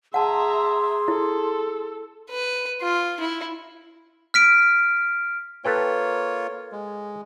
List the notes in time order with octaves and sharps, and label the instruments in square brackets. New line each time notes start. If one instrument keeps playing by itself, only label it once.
[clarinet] G#4 [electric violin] E5 A#5 [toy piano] F#5 A5 [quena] C6
[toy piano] E4 [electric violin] A4
[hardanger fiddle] B4
F4
E4
[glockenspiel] F6 B6 D7
[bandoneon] A#3 F4 C#5 [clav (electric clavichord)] A4 B4 G5
[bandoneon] G#3